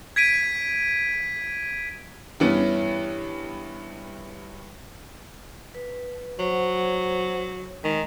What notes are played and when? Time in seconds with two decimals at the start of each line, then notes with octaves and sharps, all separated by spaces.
0.16 G#6 B6 D7 D#7
2.40 G2 E3 B3 C#4
5.75 B4
6.39 F#3 C5 F#5
7.84 D#3 G#3